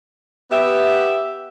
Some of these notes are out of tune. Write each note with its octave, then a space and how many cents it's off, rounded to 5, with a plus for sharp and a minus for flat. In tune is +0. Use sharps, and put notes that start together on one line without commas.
B3 +0 G4 +0 E5 +0